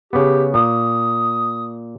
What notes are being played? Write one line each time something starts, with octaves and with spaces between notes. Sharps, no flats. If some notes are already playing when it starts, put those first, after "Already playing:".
C#3 B3 G4
A#2 D#6